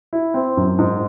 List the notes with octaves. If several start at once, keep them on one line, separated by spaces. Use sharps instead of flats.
E4
C4
F#2
G#2